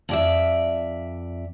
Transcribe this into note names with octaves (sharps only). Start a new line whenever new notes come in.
F2 D5 E5